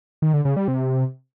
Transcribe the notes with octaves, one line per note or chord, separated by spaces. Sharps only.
D#3
D3
C#3
G3
C3